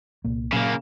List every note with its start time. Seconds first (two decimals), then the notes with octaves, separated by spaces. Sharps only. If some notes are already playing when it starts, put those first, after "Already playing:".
0.24 C2 A#2 A#3
0.52 A#2 C#3 F#3 A#3